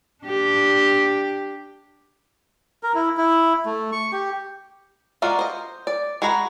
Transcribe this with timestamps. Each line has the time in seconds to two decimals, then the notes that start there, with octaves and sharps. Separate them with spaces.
0.24 D4 G4
2.83 A#4
2.95 E4
3.17 E4
3.66 A3
3.92 C#6
4.12 G4
5.22 G#3 F4 F#4 A#4 D5
5.39 C5 D#5
5.87 D5
6.22 G#3 F#4 G#4 A#5 B5